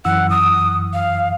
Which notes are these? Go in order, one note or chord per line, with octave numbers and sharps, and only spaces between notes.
F#2 E3 F#5 E6
D#6
F5